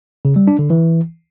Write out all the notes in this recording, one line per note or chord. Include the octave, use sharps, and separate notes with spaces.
C#3
G3
D4
D3
E3